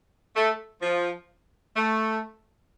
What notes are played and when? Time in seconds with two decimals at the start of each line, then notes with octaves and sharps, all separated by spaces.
0.36 A3
0.82 F3
1.76 A3